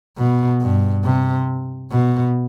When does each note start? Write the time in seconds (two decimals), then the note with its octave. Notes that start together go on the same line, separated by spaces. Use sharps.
0.18 B2
0.61 G2
1.04 C3
1.91 B2